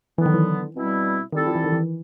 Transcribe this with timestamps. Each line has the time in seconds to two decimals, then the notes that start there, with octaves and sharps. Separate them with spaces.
0.18 D3 E3 F#3 B3
0.26 D#3
0.34 E3
0.75 B2 G3 C4 E4
1.32 D#3 G3 C4 E4 A4
1.47 F3
1.55 E3
1.64 D#3
1.72 E3